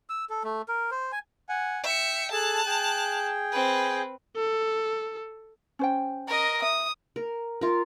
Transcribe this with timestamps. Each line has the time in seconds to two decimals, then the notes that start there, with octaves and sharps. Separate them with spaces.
0.10 E6
0.29 A4
0.44 A3
0.68 A#4
0.91 C5
1.12 G#5
1.49 F#5 G#5
1.84 E5 G5 C#7
2.32 G#4 A4 A5 F#6
2.66 G#4 G5
3.52 C4 B4
4.36 A4
5.79 C#4 C5 G5
6.27 A#4 D#5
6.62 E5 D#6
7.16 A#4
7.61 F4 A#4